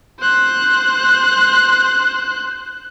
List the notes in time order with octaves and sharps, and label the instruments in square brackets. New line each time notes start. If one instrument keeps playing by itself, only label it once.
[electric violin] C5 F#6